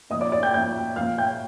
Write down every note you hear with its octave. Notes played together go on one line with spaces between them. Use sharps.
A#2 F3 D#5 D#6
D5 D6
D5 D6
G5 G6
A#2 F3 G5 G6
A#2 F3 F5 F6
G5 G6